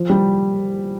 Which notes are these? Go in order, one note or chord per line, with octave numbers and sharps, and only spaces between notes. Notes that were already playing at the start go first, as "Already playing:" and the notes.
Already playing: F3
G3